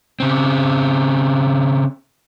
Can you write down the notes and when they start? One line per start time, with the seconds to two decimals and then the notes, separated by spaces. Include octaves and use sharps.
0.20 C#3 C4